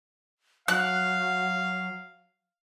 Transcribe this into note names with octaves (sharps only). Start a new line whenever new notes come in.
F#3 F5 F#6